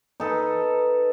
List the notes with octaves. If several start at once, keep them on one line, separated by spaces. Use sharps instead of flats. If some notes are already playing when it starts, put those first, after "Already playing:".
D#4 A4 B4